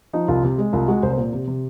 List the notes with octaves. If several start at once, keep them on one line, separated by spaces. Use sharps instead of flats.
F3 D#4
C2 F4
C3
G#3
C2 F4
G#3 F#4
C2 C5
C5
A#2
C3
C3